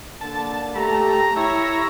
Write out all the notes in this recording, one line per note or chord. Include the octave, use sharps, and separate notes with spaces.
D3 A#3 A5
A3 G4 A#5
E4 C#5 A#5